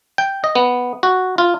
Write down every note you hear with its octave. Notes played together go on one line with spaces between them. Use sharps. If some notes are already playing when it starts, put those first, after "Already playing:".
G5
D#5
B3
F#4
F4